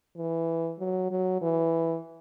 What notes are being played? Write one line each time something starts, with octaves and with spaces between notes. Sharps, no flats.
E3
F#3
F#3
E3